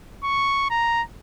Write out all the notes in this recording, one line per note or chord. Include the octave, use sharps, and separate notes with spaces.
C#6
A#5